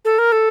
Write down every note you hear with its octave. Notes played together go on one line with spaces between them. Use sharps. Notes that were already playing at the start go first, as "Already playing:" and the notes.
A4
A#4
A4